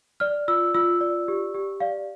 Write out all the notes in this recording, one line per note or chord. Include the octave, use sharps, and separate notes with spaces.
D5 F6
F4 E6
F4 E6
D5
G4
G4
D5 F5